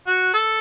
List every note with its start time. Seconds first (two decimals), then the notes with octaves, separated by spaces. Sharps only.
0.07 F#4
0.34 A4